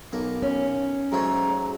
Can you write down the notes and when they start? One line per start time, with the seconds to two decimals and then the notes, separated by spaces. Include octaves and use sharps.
0.13 B1 A#3
0.42 C#4
1.12 G#2 F#3 A3 C#5 A#5